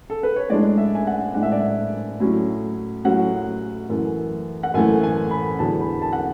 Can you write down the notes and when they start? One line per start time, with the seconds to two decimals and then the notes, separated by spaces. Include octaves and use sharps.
0.10 A4
0.23 B4
0.36 C#5
0.50 A2 G#3 D4 D5
0.78 E5
0.95 G#5
1.07 F#5
1.34 A2 G#3 D4 F#5
1.43 E5
1.52 D5
1.60 E5
2.20 A2 F#3 C#4
3.04 A2 F#3 C#4 F#5
3.89 F#2 E3 A3
4.63 F#5
4.74 F#2 E3 A3 G#5
5.03 G#5
5.31 B5
5.59 E2 D3 F#3 A5
5.81 B5
6.02 A5
6.13 F#5